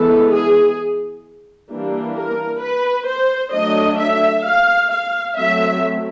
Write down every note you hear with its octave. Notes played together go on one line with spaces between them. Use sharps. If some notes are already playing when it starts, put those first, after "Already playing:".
Already playing: E3 G#3 B3 A4
G#4
E3 G3 A#3 D4
A#4
B4
C5
F#3 A3 D4 D#5
E5
F5
F5
F#3 A3 C4 E5